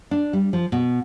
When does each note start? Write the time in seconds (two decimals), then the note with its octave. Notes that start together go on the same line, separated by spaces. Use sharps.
0.11 D4
0.33 G3
0.53 F3
0.72 B2